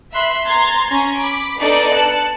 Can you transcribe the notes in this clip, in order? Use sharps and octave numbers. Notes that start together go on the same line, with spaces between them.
E5 B5 C6 F#6 C7
A#5 C6 G#6 A6
C#4 A#5 G#6
B5 D6
B3 D4 D#4 A4 D5
A5 F#6 C#7